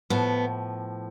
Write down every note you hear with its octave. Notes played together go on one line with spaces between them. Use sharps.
A2 F3 B3